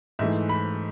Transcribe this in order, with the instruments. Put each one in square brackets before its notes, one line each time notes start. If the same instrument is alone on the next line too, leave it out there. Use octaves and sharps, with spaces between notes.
[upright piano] G#2 E3 A3 E5
B5